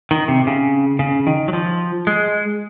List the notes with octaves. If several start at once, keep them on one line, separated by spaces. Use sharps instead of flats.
D#3
C3
C#3
C#3
D#3
F#3
F3
G#3